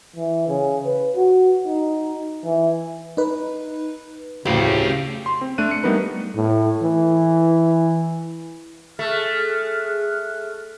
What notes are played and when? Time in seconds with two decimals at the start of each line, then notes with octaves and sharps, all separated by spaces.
0.16 E3
0.48 C#3
0.86 B4
1.16 F#4
1.67 D#4
2.45 E3
3.17 D#4 B4
4.46 D2 A2 C#3 G4 F5
5.26 C6
5.41 C4
5.58 A3 D4 F#6 D#7
5.71 C#7
5.83 G3 A3 B3 D#4 A#4 B4
6.35 A2
6.83 E3
8.99 A3 G#4 F6 F#6